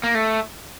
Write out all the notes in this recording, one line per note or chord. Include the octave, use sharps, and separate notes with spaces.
A#3
A3